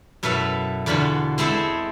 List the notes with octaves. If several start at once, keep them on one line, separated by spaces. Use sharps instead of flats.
F#2 B2 E4 A4 B4 F5
E2 B2 D3 F4 B5 C6
G#3 C4 E4 G#4 A4